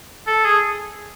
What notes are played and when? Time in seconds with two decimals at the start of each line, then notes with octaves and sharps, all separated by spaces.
0.27 A4
0.45 G#4